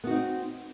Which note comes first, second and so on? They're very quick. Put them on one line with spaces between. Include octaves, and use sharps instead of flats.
B3 F#4 D#4 C4